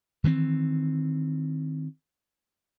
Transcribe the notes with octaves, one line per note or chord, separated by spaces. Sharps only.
D#3 E3 G3 C4